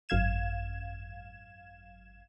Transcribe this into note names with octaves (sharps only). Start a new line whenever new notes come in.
G#1 F#2 F5 G#6 E7